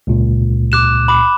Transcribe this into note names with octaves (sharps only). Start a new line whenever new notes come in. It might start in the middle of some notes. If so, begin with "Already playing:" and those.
C#2 A#2
D6 F#6 E7
B5 D6